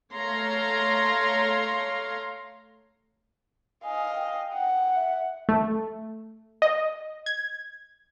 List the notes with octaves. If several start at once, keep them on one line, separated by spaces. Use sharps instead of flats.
A3 C#5 F5 A#5 C6
D#5 F5 G#5
G5
F#5
E5
A3
D#5
G#6